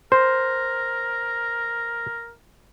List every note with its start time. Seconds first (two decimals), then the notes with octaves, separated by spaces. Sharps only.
0.12 A#4 C5